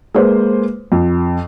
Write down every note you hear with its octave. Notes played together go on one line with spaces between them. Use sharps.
G#3 A#3 B4 C5
F2